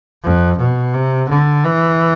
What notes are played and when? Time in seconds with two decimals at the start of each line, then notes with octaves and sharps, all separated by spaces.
0.23 F2
0.59 B2
0.94 C3
1.29 D3
1.64 E3